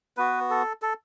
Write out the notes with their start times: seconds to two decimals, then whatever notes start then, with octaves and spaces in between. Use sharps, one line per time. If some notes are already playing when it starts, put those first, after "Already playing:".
0.17 B3 F#4 B4
0.50 A4
0.82 A4